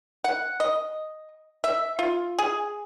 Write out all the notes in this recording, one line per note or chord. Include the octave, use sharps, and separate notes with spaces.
F#5
D#5
E5
F4
G#4